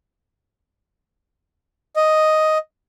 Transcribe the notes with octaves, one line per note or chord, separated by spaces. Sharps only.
D#5